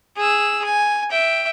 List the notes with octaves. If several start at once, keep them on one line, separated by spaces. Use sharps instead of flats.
G#4 E6
G#5
E5 G5